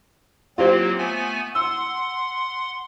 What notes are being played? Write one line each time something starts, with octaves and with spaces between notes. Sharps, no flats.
F#3 A#3 C4 F4 G4 C5
A3 B3 G#5
F#5 C6 E6